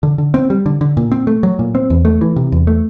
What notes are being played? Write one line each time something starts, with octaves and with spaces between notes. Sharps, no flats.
D3
D3
C4
G3
D3
D3
A#2
C4
A3
F#3
A#2
C4
E2
A3
E3
C3
E2
A3